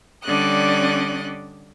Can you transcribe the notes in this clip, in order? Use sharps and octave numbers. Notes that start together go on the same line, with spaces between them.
D3 G3 C#4 D5 D#5 F#6